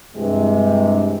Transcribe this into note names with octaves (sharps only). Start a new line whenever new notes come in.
G2 C3 E3 G#3